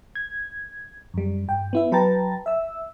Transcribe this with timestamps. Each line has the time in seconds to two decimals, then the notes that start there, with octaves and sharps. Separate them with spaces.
0.15 G#6
1.14 F#2 G3
1.48 G2 G5
1.73 B3 E4 E5
1.92 F#3 B4 G5 A5 A#5 A6
2.46 E5 E6